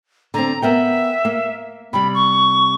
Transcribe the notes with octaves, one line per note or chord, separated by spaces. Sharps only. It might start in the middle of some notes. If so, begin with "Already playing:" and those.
D3 C4 A#5
B3 A#4 E5 G5
A#3
C3 G3 B5
C#6